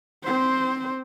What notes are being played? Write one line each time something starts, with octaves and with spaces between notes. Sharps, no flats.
C4 C5